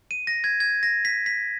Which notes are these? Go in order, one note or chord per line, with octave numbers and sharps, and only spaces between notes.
D#7
A#6
G#6
G#6
A#6
B6
B6